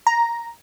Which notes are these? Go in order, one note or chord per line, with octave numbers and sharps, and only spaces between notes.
A#5